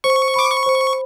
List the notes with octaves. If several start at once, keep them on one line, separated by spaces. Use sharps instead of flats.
C5 C#6
B5 D6
C#6
C5